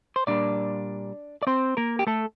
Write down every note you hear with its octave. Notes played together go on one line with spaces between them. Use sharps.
C5
A#2 G3 A#3 D4 D5
D5
C4 C5
A#3 A#4
G4
A3 A4